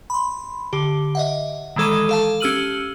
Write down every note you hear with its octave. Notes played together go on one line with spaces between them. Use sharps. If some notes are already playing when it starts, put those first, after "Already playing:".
B5 C6
D3 G4
D#5 E5 F#5
D#3 E3 G#3 A4 D6 D#7
A4 F5 A5
C#4 G4 E6 F6 D#7 F#7